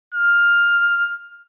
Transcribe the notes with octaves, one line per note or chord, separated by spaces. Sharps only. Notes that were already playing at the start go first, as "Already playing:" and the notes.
F6